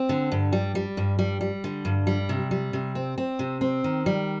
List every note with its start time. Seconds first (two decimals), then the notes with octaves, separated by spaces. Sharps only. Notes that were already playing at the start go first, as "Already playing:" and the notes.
Already playing: C4
0.09 D3
0.32 G2
0.53 G3
0.75 G3
0.97 G2
1.19 G3
1.41 G3
1.64 D3
1.85 G2
2.07 G3
2.29 C3
2.51 G3
2.73 C3
2.95 C4
3.18 C4
3.39 C3
3.61 C4
3.84 D#3
4.06 G3